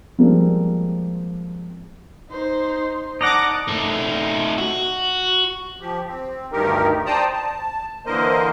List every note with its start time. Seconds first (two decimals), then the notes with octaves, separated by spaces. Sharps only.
0.18 F3 G3 G#3 A#3 C4
2.30 D#4 C5
3.21 D#4 D5 F#5 A5 D6 D#6 A#6
3.68 A3 D#4
4.58 F#4
5.81 F3 G4
6.07 C4
6.52 D2 G2 D#3 D#4 G4 A#4
7.06 C5 D5 G5 A5 A#5 D#6
7.34 A5
8.06 D3 E3 A#3 A#4 C5 D#5